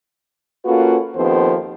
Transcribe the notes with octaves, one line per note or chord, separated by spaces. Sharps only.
A#3 C#4 F4 F#4 A4 B4
D#2 F3 B3 C4 A4 C5